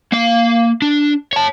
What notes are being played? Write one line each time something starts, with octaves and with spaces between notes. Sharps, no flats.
A#3 F5
D4
C#5 A5